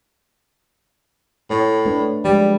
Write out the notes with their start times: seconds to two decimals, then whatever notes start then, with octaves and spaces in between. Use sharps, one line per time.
1.50 A2 C#5
1.86 A3 D4 B4
2.25 F3 G3 G#3